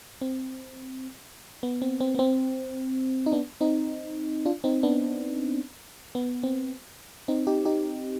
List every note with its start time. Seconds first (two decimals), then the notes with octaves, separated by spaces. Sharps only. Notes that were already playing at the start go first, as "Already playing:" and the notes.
0.21 C4
1.63 B3
1.82 C4
2.00 C4
2.15 B3
2.19 C4
3.26 D#4
3.32 B3 D4
3.61 C4 D#4
4.45 D4 F4
4.64 C4 D#4
4.83 B3 D4
6.15 B3
6.43 C4
7.28 C4 D#4
7.47 D#4 G4
7.65 D#4 G4